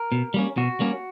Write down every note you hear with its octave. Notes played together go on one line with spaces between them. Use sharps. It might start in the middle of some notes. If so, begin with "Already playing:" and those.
Already playing: A#4
B2
G3 A#3 C#4
B2 F#4
G3 A#3 C#4